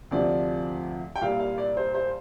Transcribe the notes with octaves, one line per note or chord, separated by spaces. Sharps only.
D2 C3 F3 D5
G5
C2 A#2 G3 F5
F5
D5
C5
C5